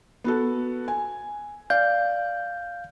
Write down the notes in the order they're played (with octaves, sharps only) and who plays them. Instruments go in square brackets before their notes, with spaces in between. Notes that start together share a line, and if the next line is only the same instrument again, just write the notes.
[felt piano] B3 F#4 A4
G#5
[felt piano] D5 [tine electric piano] F5 G6